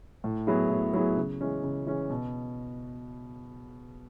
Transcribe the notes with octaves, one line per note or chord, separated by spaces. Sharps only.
A2
F#3 B3 E4 G#4
A2
F#3 B3 E4 G#4
C#3
E3 G#3 C#4
C#3
E3 G#3 C#4
B2